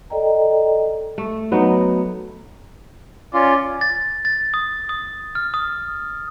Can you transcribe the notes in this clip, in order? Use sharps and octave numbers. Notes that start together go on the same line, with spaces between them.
A4 D5 D#5 G5 A#5
A3
F#3 B3 D#4
C#4 F4 D5
A6
A6
D#6
D#6
F6
D#6